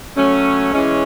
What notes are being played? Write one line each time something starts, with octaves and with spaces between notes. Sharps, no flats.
F#3 A3 C#4
E3 G#3 C#4